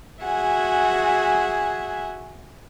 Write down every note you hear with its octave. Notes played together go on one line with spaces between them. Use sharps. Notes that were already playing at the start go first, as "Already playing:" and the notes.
F#4 G#4 E5 F#5 G#5